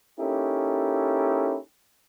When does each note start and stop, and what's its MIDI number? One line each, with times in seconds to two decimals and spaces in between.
0.19 1.57 58
0.19 1.57 61
0.19 1.57 63
0.19 1.57 64
0.19 1.57 67
0.19 1.57 69